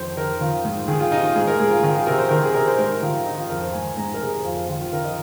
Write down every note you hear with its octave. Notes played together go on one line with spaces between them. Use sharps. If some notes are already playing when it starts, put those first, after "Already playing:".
Already playing: F2 D#3 C5
D#3 A#4
D#3 F4
G#2
D#3 G#4
F4
C3 D#4
F4
G#2 G#4
A#4
G#2 G#4
F4
D#3 F4
G#4
C3 A#4
C5
D#3 A#4
G#4
C3 A#4
C5
G#2 A#4
D#3 F4
D#3 D#4
F4
F2 A#4
C5
G#2 G#5
G#2 A#5
A#4
C3 G#4
F2 F4
D#3 F4
F4
D#3 A#4
D#5